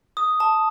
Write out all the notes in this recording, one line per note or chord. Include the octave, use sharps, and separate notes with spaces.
D#6
A5